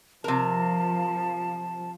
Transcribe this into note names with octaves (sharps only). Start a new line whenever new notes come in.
C3 F3 A#4 A5